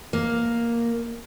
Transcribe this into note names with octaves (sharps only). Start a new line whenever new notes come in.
A#3